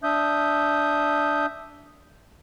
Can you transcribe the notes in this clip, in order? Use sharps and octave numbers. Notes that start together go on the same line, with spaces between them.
D4 E5 D#6 G6